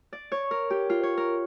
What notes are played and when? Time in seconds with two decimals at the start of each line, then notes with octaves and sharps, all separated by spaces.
0.13 D5
0.32 C#5
0.51 A#4
0.70 G4
0.90 F4
1.03 C#5
1.17 A#4